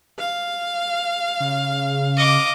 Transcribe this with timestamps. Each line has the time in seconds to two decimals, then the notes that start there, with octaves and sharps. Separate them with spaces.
0.18 F5
1.40 C#3
2.17 D#5 D6